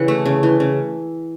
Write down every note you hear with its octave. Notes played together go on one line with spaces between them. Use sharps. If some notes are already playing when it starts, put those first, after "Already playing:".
Already playing: C#3 E3 F#5
A3
C#3
E3
C#3